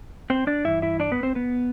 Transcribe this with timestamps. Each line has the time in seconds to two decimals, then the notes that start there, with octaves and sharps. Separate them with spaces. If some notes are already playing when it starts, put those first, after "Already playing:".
0.30 C4 C5
0.47 D4 D5
0.65 G2 E3 E4 E5
0.82 E4 E5
1.00 D4 D5
1.12 B3 B4
1.23 C4 C5
1.35 B3 B4